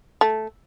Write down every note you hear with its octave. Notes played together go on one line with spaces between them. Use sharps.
A3